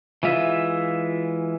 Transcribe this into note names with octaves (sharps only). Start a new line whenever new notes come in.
E3 G#3 F4 E5